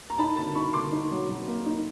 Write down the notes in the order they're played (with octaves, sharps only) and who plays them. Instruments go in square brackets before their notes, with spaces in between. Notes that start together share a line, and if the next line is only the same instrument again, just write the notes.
[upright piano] A#5
D#4 A5 B5
D3 A5 B5
D#4 B5 C#6
D3 C6 D6
D#4
F#3
F#3
A#3
D#4